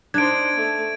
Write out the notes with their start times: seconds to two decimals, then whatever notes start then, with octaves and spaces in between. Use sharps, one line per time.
0.14 D4 D#4 C5 G#6 D7
0.56 A3